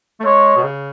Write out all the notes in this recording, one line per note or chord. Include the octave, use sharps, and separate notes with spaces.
A3
G#3 C#5
B2
C#3